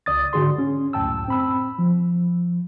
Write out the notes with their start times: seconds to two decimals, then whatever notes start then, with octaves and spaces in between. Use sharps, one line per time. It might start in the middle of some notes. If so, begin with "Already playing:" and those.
0.06 C#2 D5 D#6 A6
0.33 G#2 D3 F#4 G#4 C6
0.59 C#4
0.93 C#2 F#2 A2 G5 A5 E6
1.28 C4 B5 E6
1.79 F3